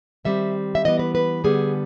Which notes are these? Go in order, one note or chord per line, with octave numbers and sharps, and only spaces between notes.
D#3 G3 C4 E5
E5
E3 G3 B3 D#5
B4
B4
D3 G3 B3 G#4